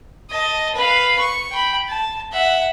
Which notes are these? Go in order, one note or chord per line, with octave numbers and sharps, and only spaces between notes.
D#5 A5
B4 F5
C#6
G5 B5
A5
E5 F#5